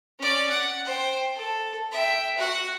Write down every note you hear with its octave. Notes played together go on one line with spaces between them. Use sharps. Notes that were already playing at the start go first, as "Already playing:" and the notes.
C#4 D5
F#5
C5 G5
A4
E5 G5
F#4 F#5